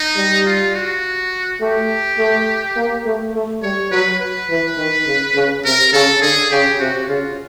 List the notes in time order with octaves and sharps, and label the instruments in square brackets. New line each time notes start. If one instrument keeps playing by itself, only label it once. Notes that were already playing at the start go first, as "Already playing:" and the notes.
Already playing: [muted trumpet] D#4
[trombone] G3
[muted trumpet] F4
F#4
[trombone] A3 [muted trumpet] G4
[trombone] A3
A#3
A3
A3
[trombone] G3 [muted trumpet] C#5
[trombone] F#3 [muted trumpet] B4
[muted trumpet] B4
[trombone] E3
D#3
C#3
C#3
[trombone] C3 [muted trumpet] A#4
[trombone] C#3 [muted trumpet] A4
[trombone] D3 [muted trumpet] G#4
[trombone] C#3 [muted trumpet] G4
[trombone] C3 [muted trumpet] F#4
[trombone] C#3 [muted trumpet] F4